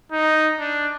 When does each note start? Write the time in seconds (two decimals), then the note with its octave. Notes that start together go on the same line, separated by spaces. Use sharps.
0.12 D#4
0.59 D4